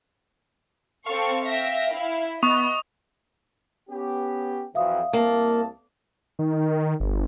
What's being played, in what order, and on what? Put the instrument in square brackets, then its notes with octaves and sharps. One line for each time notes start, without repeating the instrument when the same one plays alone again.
[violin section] C4 A4 C#6 [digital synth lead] F5
[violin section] E5 G5 A#6
E4
[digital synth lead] B3 [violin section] D#5 [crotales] C#6 D#6 F7
[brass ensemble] B3 C#4 G4
[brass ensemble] F2 E3 F#3 [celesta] E5 F5 D#6
[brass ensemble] C2 A5 [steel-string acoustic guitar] A#3
[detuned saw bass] D#3
G1